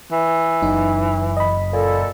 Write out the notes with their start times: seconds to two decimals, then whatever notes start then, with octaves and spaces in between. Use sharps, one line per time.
0.12 E3
0.62 F#1 F#2 D#4
1.37 D#5 B5
1.73 A#2 A4